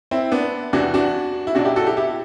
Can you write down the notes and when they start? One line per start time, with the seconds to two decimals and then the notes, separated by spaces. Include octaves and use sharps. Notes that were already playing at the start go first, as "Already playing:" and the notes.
0.11 C4 E4
0.32 B3 D4
0.73 E2 C3 E3 D4 F#4
0.94 D4 F#4
1.47 E4
1.55 B1 B2 F#3 D4 F#4
1.65 E4 G4
1.76 F#4 A4
1.86 E4 G4
1.97 E4 G4